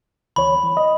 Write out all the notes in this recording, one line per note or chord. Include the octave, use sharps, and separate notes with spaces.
D2 E3 C#5 B5
E3
D#5